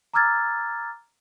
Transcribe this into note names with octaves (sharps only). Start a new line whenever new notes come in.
A#5 D6 E6 F6 G#6 A6